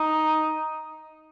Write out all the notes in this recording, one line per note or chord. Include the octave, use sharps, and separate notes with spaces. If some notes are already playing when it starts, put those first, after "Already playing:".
Already playing: D#4